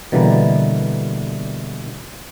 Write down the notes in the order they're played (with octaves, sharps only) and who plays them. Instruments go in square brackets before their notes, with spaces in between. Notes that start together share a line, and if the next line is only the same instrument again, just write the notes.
[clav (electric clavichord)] B2 D3 E3 G3 A#3